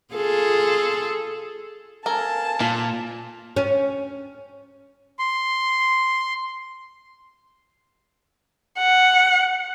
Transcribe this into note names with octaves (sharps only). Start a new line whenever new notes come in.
F4 G#4 A4
A4 A#4 F5 G#5 A5
A#2 F4
C#4
C6
F#5